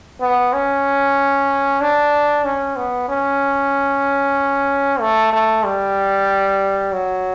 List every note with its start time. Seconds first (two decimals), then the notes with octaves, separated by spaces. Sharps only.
0.21 B3
0.53 C#4
1.81 D4
2.44 C#4
2.76 B3
3.09 C#4
5.00 A3
5.33 A3
5.65 G3
6.93 F#3